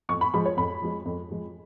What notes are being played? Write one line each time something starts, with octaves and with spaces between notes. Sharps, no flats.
F2 C#6
B5
F3 G#3 B5
C#5
F2 B5
F3 G#3
F2
F3 G#3